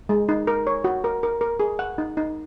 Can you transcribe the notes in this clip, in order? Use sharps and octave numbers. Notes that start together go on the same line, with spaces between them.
G#3
D#4
A#4
C#5
F#4
A#4
A#4
A#4
G#4
F#5
D#4
D#4